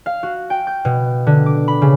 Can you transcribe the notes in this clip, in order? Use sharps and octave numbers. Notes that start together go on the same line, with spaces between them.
F5
F#4
G5
G6
B2
D3
D6
B5
C#3